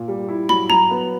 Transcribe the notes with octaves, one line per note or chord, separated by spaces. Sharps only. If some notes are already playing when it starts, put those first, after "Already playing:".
Already playing: A#2
G3
E4
F#3 B5
F#3 A#5
B3